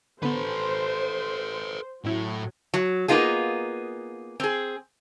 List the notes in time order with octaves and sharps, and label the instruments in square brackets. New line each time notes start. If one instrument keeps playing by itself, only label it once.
[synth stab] D3 B3 [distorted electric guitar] A4 B4 [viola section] C5
[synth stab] A1 E4 [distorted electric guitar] A2 [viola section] F#3
[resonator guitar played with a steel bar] F#3
A#3 B3 D#4 F4 G#4
C4 G#4